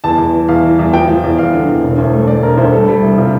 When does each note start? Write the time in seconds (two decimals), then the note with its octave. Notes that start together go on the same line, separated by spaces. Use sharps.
0.04 E2 A5
0.18 E2
0.34 E3
0.48 E2 F5
0.63 E3
0.79 E2
0.93 F3 G5
1.08 F3
1.24 E2
1.39 E2 F5
1.53 D3
1.68 E2
1.83 E1
1.98 D2
2.13 A3
2.27 A3 D5
2.43 E1 A#4
2.57 D2 C5
2.73 G3 A4
2.88 G3
3.03 C2
3.18 C3 F4